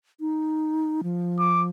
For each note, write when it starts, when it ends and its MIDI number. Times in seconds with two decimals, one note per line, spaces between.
0.20 1.01 63
1.03 1.70 53
1.39 1.63 86